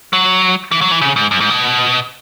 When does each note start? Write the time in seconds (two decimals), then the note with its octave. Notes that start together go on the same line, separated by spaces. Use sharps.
0.13 F#3
0.72 E3
0.81 F#3
0.91 E3
1.01 C#3
1.16 G#2
1.31 F#2
1.40 G#2
1.50 B2